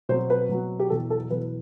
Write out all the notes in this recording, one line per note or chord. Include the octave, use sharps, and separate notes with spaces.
B2 F#3 C4 C5
B4
B2 F#3 C4
G4
E2 B2 F#3 B3 A4
A4
E2 B2 F#3 B3 B4